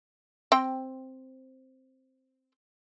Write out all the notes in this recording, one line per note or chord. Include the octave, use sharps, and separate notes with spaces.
C4 G5